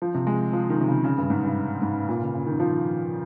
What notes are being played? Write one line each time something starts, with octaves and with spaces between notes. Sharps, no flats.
F3
C3
G#3
F3
D#3
C3
C#3
C#3
G2
G#2
G2
G#2
A#2
C#3
C#3
D#3
F3